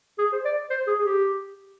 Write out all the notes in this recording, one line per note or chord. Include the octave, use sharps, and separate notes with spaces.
G#4
C5
D5
C5
G#4
G#4
G4